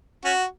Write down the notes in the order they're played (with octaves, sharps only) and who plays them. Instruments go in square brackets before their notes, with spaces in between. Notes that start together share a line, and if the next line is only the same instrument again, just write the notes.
[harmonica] C#4 F#4